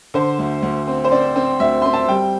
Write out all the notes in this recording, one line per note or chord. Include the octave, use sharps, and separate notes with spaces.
D3 C5
D2
D2
C4
C5
C4 D5
C4
D2 E5
C4 C6
A5
G3 G5